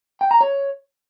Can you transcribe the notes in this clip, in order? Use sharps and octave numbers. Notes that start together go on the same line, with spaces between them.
G5
A#5
C#5